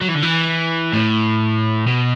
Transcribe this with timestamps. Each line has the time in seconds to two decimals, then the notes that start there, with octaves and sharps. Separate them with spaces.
0.02 F#3
0.08 E3
0.15 D3
0.23 E3
0.93 A2
1.87 B2